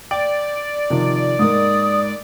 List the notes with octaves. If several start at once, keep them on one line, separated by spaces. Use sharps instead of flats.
D5 G5
C3 D#3 F3
G#2 A#3 D#6